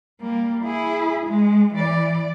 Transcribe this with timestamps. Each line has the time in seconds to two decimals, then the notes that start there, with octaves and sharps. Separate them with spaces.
0.21 G3 A#3
0.64 E4 G#4
1.26 G#3
1.74 E3 D5